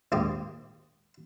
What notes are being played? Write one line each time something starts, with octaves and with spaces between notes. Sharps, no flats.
A#1 D#2 G#2 G4 F5 D#6